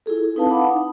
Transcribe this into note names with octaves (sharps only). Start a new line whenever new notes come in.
E4 F4 G#4 A4
C4 D#4 E4 B4 F5 A5
D#4 F5 F#5 A5 B5 D6
D#4